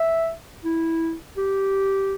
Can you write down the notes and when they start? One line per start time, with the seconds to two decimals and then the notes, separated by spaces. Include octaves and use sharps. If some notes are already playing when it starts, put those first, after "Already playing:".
Already playing: E5
0.64 E4
1.37 G4